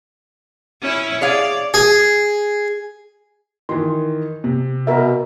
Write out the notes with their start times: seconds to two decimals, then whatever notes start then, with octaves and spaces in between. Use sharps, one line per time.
0.81 C#4 E4 C#5
1.21 G#4 C#5 D5 F5
1.74 G#4
3.69 D#3 E3 C6
4.44 C3
4.87 B2 A#4 E5